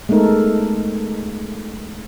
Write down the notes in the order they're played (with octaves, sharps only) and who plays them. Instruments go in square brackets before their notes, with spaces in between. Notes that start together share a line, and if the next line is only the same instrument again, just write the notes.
[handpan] G#3 A3 B3 D#4 A4 A#4